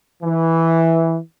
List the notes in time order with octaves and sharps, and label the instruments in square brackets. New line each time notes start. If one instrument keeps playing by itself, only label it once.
[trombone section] E3